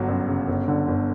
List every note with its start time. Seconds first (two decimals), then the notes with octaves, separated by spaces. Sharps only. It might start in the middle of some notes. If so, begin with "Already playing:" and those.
Already playing: G1 F#3
0.08 F#2
0.28 C#3
0.48 G1
0.68 D3
0.88 G1